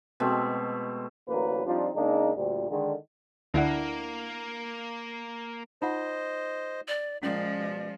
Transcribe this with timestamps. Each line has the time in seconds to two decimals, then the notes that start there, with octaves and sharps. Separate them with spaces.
0.20 B2 G#3 A3 C4
1.28 A1 D2 F#3 A#3 A#4 B4
1.66 F3 G3 C4 D4 D#4 F4
1.95 C#3 G#3 A#3 D4 D#4
2.36 D2 A#2 G3
2.71 D3 D#3 G#3
3.54 D2 A#3 D4 E4 F#5
5.82 D#4 F4 C5 D#5 F#5
6.88 D5
7.23 A#2 F3 G#3 C#4 D5
7.58 B2